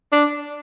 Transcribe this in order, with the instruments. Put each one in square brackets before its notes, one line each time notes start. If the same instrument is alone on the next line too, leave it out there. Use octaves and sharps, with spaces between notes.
[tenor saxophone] D4